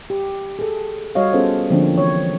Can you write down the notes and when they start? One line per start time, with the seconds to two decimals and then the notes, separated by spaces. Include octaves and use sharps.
0.10 G4
0.59 G#4 A4
1.15 G3 F#4 C#5 D#5 F5
1.33 B3 C#4 F4 G#4 A4 C5
1.70 D3 F3 A#3 C4 D4
1.95 E3 C#5